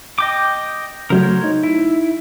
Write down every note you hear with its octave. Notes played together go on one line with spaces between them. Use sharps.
D#5 G5 D6
C#3 F#3 A3 A#4 C5 C#5
D#4
E4